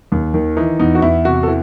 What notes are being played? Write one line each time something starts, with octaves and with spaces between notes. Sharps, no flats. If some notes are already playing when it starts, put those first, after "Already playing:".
D#2
D#3
E3 D#4
E2 D#4
F#4
E2 E4
C3 F#4
A4
E3